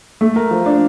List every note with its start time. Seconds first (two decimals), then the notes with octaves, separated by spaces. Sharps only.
0.21 A3
0.36 A#4
0.51 F3
0.66 D4